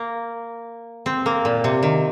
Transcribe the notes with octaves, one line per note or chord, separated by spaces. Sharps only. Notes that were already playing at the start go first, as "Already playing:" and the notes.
Already playing: A#3
C4
A#3
A#2
C3
D#3